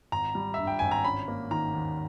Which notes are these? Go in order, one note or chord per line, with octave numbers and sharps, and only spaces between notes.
G#1 A#5
G3
G2 E5
G5
G#1 G#5
A#5
C#4 B5
A#3
D#3 A#5
D#2